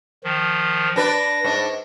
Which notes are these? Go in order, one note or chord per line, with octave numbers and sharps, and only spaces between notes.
D#3 F3
D4 B4 D5 A#6
G#2 D4